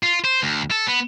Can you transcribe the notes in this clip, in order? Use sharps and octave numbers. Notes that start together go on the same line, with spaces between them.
F4
C5
D2
A4
B3